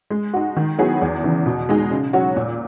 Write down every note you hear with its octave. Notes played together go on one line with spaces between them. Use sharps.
G#3
D#4 F#4
D#3
F#3 B3 E4 G#4
E2
C#3 E3
B2
G#3 D#4 G#4
C#3
F#3 C#4 F#4 C#5
A#2